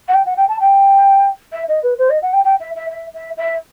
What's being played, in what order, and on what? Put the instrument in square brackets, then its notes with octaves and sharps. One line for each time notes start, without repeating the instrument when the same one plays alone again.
[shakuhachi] F#5
G5
F#5
G5
A5
G5
E5
D#5
B4
C5
D#5
F#5
G5
G5
E5
E5
E5
E5
E5